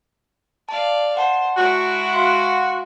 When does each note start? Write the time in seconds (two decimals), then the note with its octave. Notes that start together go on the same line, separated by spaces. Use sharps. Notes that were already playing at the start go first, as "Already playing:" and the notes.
0.69 D5 F5 A5
1.17 C5 F#5 A5
1.57 G#3 E4 F#4
2.13 F5 C6